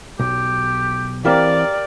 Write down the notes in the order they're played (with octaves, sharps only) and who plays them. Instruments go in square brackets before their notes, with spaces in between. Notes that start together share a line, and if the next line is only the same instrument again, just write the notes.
[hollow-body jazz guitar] B1 [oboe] G4
[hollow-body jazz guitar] E3 C4 [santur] G4 A#4 F5 [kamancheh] D5